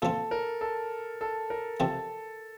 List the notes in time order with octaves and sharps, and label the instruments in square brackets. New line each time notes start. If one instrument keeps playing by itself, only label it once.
[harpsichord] A#2 F3 C4 F4 [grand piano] A4
[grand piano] A#4
A4
A4
A#4
[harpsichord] C3 F3 C4 G4 [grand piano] A4